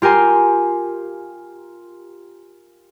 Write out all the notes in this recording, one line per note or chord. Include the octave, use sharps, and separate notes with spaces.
F4 G4 A#4 G#5 C6